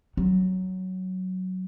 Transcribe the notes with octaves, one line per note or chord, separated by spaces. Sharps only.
F#3